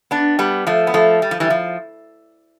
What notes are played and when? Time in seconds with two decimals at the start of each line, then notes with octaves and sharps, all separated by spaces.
0.11 B3 D4
0.39 G3 B3
0.67 F3 A3
0.87 B3
0.94 F3 A3
1.22 G3
1.31 F3
1.40 E3 G3
1.50 F3